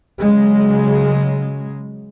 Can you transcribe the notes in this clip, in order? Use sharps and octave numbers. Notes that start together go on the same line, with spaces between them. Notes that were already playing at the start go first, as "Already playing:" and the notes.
C#3 F#3 G#3